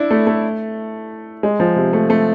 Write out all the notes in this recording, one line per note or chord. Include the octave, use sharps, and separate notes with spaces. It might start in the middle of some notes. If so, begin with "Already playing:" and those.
Already playing: D4 E4
A3
A3
G#3
F3
C3
A3
A3